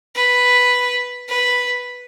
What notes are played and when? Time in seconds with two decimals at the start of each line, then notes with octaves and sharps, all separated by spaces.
0.15 B4
1.28 B4